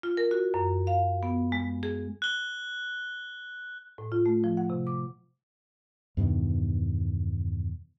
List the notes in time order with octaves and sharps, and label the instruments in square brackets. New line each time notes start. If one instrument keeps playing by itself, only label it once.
[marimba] F4
A#4
F#4
F#2
F5
B3
G#3
G#4
[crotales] F#6 G7
[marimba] A2
F4
A3
F3
F#5
C3
D6
[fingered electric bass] E2 G2 B2 D#3